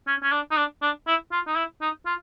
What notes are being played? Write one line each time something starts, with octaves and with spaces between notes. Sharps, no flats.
C#4
C#4
D4
D#4
D4
D4
E4
F4
D#4
E4
D#4
F4